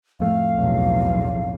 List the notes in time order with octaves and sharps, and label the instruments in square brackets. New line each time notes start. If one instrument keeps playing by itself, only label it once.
[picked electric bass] F2 A2 A3 [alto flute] F5
[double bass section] B1 E2